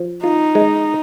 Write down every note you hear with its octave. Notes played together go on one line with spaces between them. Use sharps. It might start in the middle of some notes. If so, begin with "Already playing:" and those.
Already playing: F3
D#4 F4
G#3